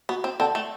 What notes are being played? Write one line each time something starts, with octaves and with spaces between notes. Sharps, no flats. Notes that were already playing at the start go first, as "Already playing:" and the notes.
B3 F#4
C4
C4 A4 D5 F#5 A5
A3